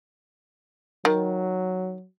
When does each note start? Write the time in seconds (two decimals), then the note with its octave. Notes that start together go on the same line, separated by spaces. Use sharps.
1.05 D#3 F#3